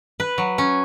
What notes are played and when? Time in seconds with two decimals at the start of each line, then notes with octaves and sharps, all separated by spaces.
0.20 B4
0.38 F#3
0.58 C#4